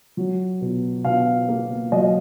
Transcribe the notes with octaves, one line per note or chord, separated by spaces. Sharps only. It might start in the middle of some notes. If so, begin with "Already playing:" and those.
F#3
B2
B2 F5
A#3
F#3 D#5